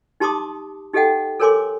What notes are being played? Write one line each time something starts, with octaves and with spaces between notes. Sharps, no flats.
D#4 G4 A5 C6 D6 D#6
D#4 G4 A4 D#5 F#5 G5
A4 A#4 C#5 G#5 C6 D6